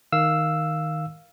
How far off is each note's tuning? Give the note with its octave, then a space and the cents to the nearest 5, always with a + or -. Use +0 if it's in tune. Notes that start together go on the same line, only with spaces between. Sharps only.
D#3 +0 F5 +0 E6 +0